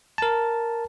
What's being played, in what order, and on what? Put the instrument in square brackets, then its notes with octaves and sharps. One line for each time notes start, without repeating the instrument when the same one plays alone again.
[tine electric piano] A#4 A5